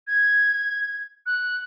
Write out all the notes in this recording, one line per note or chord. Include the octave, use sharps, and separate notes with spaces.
G#6
F#6